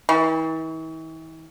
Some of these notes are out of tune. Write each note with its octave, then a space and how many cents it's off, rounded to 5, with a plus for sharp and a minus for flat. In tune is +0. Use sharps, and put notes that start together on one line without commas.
E3 -40